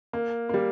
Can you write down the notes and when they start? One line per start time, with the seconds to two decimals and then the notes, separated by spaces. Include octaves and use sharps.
0.13 A#3
0.49 A#3
0.54 G3